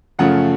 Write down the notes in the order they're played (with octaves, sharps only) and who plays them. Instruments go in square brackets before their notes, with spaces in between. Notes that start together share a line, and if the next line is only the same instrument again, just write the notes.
[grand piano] F#2 C#3 F3 A3 F#5